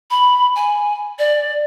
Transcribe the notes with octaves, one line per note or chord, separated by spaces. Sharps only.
B5
G#5
D5